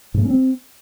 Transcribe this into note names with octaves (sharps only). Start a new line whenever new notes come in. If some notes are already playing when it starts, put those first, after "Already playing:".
G#2
A3
C#4
C4